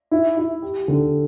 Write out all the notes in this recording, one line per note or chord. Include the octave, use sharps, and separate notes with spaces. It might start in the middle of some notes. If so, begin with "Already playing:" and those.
E4
E4
G4
D3